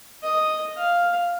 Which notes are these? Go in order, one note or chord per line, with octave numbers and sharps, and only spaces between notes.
D#5
F5